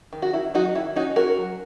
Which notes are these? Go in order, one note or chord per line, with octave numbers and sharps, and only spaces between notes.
D#3
F#4
D#3 E4
F#3 D#4 F#4
D#3 E4
C#4 D#4 F#4
C#4 F#4 A#4
F#3